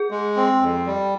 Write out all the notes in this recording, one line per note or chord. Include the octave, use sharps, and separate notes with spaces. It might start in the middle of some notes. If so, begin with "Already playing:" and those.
Already playing: G#4
G#3
C4
F2
G3